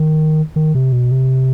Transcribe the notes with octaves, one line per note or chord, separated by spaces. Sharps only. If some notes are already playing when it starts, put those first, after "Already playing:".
Already playing: D#3
D#3
C3
B2
C3